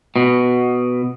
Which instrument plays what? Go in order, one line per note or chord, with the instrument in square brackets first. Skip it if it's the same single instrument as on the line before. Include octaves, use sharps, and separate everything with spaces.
[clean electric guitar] B2